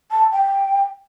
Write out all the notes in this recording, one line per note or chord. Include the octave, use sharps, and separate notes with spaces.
A5
G5